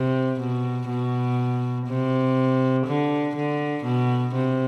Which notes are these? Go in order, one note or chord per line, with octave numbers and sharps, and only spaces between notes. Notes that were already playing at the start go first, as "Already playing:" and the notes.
Already playing: C3
B2
B2
C3
D3
D3
B2
C3